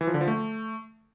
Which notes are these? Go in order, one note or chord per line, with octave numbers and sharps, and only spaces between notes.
E3
F3
D3
F3
A3